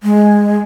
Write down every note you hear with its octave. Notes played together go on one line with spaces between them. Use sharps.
G#3